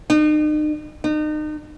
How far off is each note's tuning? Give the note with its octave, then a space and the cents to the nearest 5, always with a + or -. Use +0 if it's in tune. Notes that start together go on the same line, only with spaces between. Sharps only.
D#4 -40
D#4 -35